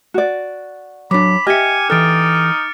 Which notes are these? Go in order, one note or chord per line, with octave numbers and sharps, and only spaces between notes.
F#4 D5
F#3 D4 B5 D6
G4 D#5 E5 G#5 F6 C#7
E3 D#4 A4 F6 A6 D7